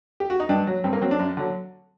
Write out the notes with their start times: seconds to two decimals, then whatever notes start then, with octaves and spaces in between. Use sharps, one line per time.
0.20 G4
0.30 F#4
0.40 D#4
0.49 G2 D4
0.67 F#3
0.84 G2 C4
0.93 A#3
1.01 F#3 C4
1.11 D4
1.19 F#2
1.37 D3 F#3